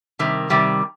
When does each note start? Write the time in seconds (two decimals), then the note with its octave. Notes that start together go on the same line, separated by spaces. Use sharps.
0.19 C3 D#3 G3
0.50 C3 D#3 G3